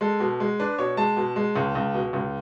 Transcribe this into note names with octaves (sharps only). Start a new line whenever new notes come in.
G#3 A4
B2
G#3
D4 B4
B2 C#5
G#3 A5
B2
G#3
C#2
C#2
B2
C#2